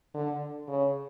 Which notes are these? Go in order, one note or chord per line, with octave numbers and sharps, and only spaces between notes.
D3
C#3